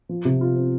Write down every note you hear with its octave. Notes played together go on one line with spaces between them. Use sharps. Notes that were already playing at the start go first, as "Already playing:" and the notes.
F3
C3
F4
C4